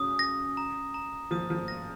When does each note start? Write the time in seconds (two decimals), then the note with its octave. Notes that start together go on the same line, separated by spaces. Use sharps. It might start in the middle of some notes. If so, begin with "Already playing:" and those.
Already playing: C#3 F#3 D#6
0.19 A#6
0.57 A#5
0.94 A#5
1.31 F3 D#6
1.50 F3
1.68 A#6